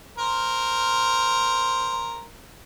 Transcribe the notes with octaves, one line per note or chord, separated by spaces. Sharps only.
A#4 C5